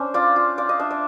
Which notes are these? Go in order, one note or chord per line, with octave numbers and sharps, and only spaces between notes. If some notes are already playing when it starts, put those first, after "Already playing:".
Already playing: C#4 D4 C5
F4 D5
F4
F4 D5
D#5
D4 E5
D5